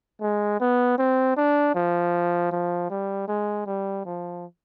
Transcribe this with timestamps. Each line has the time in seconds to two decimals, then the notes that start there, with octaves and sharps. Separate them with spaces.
0.22 G#3
0.60 B3
0.98 C4
1.37 D4
1.75 F3
2.52 F3
2.90 G3
3.28 G#3
3.66 G3
4.05 F3